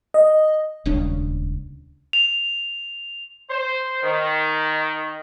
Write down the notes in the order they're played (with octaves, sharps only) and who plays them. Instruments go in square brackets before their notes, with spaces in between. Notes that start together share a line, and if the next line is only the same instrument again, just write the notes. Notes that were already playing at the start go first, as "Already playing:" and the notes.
[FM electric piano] D#5
[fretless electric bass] D#1 C#2 C#3 D4
[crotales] F7
[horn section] C5
D#3